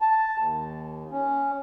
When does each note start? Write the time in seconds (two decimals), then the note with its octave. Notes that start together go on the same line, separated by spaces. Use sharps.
0.01 A5
0.38 D#2
1.11 C#4